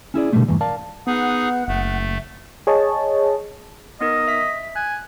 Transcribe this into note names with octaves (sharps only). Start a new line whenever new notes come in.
C#4 E4 G#4 D5
B2 D3 E3 G3 A3 C4
E2 G2 E3 A3
A#4 D5 F5 A5
B3 D#4 G#4 F#5
F#1 A3
G#4 C#5 D#5 A5
B3 D#4 A#4 D#5
E5 B6
G#5 F#6